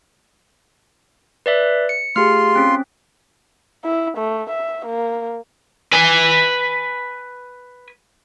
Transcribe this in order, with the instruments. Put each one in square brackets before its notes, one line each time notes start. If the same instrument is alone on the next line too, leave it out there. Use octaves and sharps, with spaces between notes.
[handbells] B4 D5 E5
C#7
[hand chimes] A3 G4 G#4 [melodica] F4 C6 [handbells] F6
[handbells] C4 C#4
[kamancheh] E4
A3
E5
A#3
[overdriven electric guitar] B4 G#5